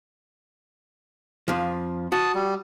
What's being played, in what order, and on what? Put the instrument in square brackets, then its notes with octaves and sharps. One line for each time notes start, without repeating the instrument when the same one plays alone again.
[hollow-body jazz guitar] F2 F3
[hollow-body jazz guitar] F#4 [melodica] A5 D#6
[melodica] G3